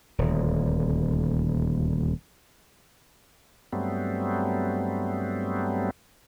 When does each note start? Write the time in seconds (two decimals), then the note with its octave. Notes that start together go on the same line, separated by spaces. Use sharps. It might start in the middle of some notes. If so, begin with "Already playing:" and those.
0.18 D#1 D2
3.72 G2 F#3 G3 A3 B3 C4